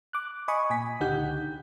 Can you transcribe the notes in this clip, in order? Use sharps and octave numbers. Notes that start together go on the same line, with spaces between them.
D6 F#6
D#5 G#5 B5 C#6 D#6
A#2 G#5 B6
C#2 D3 D#4 G4 F#5 G6